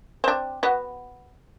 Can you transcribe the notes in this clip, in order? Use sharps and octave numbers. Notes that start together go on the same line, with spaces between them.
C4 D4
B3 F#4